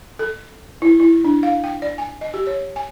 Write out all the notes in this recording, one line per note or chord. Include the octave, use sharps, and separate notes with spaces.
A4
E4
E4
D4
F5
G5
D5
G#5
D#5
G4
C#5
G#5